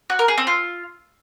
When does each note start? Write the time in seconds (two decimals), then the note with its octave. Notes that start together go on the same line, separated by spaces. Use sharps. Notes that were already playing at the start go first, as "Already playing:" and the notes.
0.10 F#4
0.19 A#4
0.28 G#4
0.38 C4
0.47 F4